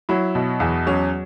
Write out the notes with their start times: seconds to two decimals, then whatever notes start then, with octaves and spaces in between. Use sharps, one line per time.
0.09 F#3 E4
0.35 B2
0.60 E2
0.87 F#3 C#4